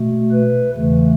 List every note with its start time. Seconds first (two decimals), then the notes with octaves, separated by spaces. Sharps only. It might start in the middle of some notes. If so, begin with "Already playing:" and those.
Already playing: B2 A3
0.32 B4
0.76 E2 C#3 E3 A3